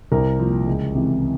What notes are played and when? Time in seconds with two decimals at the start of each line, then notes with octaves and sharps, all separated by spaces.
0.12 C2 A#4
0.39 A#2 F3
0.67 C#2
0.95 C3 E3